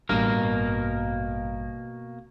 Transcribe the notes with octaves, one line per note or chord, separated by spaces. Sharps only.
A1 G2 B2 A#3 A#4